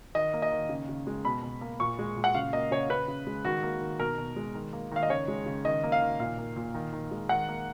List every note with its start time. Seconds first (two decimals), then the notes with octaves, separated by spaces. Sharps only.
0.15 D#3 D#5
0.33 A#3
0.42 D#5
0.52 D#3
0.69 C#3
0.89 C#3
1.07 G#3
1.25 B2 B5
1.43 B2
1.61 A#3
1.80 A#2 C#6
1.99 G#3
2.17 A#2
2.24 F#5
2.35 C#3 F5
2.53 A#3 D#5
2.71 C#3 C#5
2.89 C#3 B4
3.08 C#3
3.27 G#3
3.45 D#3 F#4
3.63 A#3
3.81 D#3
3.99 B2 A#4
4.18 B2
4.36 G#3
4.55 D#3
4.73 A#3
4.92 D#3 F5
5.03 D#5
5.10 C#3 C#5
5.28 G#3
5.46 C#3
5.65 D#3 D#5
5.83 A#3
5.92 F5
6.01 D#3
6.20 A#2 F5
6.38 A#3
6.56 A#2
6.74 D#3
6.93 D#3
7.11 G#3
7.29 D#3 F#5
7.49 A#3